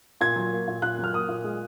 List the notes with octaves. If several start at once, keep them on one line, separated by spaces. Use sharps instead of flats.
A#2 G#6
F#3
A#3
A#2
A#2 F#6
F#3
F6
A#3 D#6
A#2
G#3